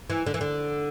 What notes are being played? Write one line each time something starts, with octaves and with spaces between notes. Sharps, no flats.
E3
D3
E3
D3